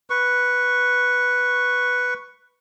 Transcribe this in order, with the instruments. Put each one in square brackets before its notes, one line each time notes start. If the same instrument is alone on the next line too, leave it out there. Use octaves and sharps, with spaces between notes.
[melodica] B4 C#6